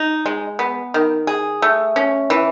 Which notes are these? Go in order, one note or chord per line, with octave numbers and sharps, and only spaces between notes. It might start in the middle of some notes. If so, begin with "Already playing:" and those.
Already playing: D#4
G#3
B3
D#3
G#4
A3
C#4
E3